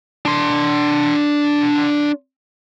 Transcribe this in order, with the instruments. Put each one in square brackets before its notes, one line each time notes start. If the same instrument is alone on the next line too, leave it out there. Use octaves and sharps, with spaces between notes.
[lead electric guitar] D4 C6